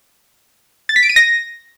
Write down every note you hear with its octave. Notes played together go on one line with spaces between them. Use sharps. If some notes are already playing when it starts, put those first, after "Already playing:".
A6
B6
D7
D#7
A#6